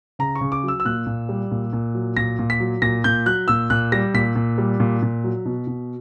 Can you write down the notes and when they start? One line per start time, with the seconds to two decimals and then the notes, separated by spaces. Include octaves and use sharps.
0.19 C#3 A#5
0.35 C#6
0.41 C#3
0.52 D6
0.63 F#3
0.68 E6
0.80 E6
0.85 A#2 F#6
1.06 A#2
1.29 G3
1.51 A#2
1.73 A#2
1.95 F#3
2.17 A#2 A#6
2.39 A#2
2.50 B6
2.60 F#3
2.82 A#2 A#6
3.04 A#2 G6
3.26 F#3 F#6
3.48 A#2 E6
3.70 A#2 F#6
3.92 G3 A#6
4.14 A#2 B6
4.36 A#2
4.58 G3
4.80 A#2
5.02 A#2
5.24 F#3
5.45 B2
5.67 B2